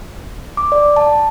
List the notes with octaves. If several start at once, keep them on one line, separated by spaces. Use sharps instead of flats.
D6
D5
A5